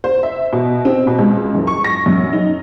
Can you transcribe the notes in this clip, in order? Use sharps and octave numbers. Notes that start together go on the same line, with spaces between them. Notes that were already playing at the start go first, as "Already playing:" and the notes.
C5
E5
B2
C4
B2
C#2
F#1
C#6
A#6
F#2
D#4